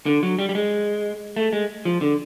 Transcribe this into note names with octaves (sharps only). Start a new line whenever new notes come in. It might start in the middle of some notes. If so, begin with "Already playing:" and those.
D3
F#3
G3
G3
G#3
A3
G#3
F3
D3